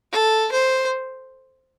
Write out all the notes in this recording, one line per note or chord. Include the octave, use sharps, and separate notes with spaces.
A4
C5